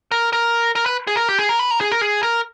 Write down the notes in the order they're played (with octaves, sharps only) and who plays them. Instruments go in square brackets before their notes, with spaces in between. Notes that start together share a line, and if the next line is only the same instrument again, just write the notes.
[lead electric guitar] A#4
A#4
A#4
B4
G#4
A#4
G4
G#4
A#4
B4
A#4
G#4
A#4
G#4
A#4